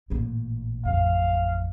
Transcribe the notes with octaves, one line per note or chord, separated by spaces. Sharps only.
A1 A#2
A1 F2 F5